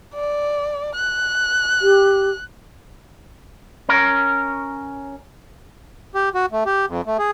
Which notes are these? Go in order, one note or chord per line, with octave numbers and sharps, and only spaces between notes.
D5
F#6
G4
C#4 A#4
G4
F#4
A3
G4
F2
A3
G#4